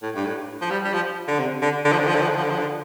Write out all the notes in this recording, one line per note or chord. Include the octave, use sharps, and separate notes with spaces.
A2
G2
A2
F3
G3
G3
F3
D3
C3
D3
D3
F3
D3
F3
D3
F3
D3
F3
D3
F3
D3